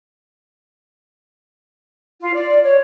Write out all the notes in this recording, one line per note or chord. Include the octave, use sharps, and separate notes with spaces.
F4
D5
C#5